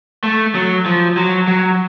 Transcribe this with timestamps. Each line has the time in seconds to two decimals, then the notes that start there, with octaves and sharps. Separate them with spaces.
0.23 A3
0.55 F#3
0.86 F3
1.17 F#3
1.48 F#3